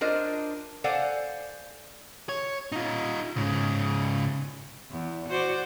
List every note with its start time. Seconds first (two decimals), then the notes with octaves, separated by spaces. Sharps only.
0.01 D4 F4 A#4 C5 D#5
0.84 A4 C5 D5 F5 F#5 G#5
2.29 C#5
2.72 D#4 F4
3.36 G#2 C#3
4.90 E2
5.28 F#4 C5 D5